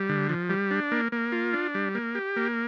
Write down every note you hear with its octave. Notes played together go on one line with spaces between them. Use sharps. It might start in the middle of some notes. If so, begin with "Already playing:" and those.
Already playing: G3
D3
F3
G3
D4
A#3
A#3
F4
D4
G3
A#3
G4
A#3